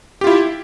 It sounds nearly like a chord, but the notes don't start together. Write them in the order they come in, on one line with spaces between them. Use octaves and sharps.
G4 F4 E4